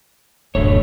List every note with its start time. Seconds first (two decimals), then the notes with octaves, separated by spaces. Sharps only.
0.55 D1 B1 F#2 D3 A3 C#5